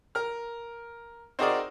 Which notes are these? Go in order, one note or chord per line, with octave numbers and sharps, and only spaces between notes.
A#4 F6
C4 D#4 F#4 G#4 A#4 D5